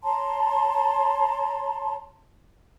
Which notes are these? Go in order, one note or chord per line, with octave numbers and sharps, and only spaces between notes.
C#5 A5 A#5 C6